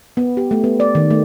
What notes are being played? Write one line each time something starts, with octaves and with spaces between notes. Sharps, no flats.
B3
G4
A3
B3
D5
D#3
A3